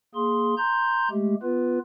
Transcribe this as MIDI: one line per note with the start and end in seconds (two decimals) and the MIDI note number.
0.15 0.55 58
0.15 0.55 68
0.15 0.55 84
0.58 1.09 82
0.58 1.09 84
0.58 1.09 91
1.11 1.35 56
1.11 1.35 57
1.11 1.35 67
1.43 1.79 59
1.43 1.79 65
1.43 1.79 71